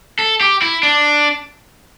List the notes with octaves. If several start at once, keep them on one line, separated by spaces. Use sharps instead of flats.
A4
G4
E4
D4